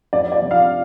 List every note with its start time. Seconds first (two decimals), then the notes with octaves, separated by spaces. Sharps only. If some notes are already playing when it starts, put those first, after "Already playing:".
0.13 F2 D5
0.32 D5
0.42 C3 F3
0.51 F5